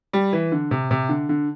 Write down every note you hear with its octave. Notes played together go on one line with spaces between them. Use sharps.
G3
E3
D3
C3
C3
D3
D3